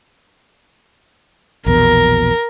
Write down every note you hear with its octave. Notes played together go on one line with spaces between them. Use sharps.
A#1 E2 B2 A#4